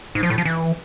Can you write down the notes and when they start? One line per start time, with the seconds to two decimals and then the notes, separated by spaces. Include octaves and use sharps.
0.15 G#2
0.23 F3
0.30 A2
0.38 F3
0.45 E3